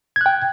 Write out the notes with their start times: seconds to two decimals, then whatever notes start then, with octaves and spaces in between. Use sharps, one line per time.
0.16 G#6
0.21 F#6
0.26 G5